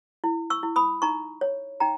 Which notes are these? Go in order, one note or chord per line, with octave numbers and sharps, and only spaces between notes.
E4
C#6 E6
E4
B5 D#6
D#4 A#5 C#6
C#5
D#4 G5 A#5